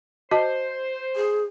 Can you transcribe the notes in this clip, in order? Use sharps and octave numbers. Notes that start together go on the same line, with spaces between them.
F#4 C5 D#5 A5
G#4